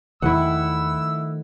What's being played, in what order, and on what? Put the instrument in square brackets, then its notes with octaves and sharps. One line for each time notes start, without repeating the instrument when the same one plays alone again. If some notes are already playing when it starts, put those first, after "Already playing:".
[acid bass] E2 [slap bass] D#3 F3 A3 [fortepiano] E4 F#5 [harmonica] E6